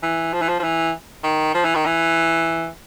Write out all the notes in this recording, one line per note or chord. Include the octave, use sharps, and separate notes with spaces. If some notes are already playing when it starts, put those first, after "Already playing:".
E3
F3
E3
F3
F3
E3
D#3
F3
E3
D#3
E3